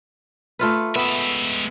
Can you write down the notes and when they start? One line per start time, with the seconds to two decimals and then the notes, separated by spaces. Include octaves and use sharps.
0.59 A3 F4 B4
0.95 G#3 B3 E5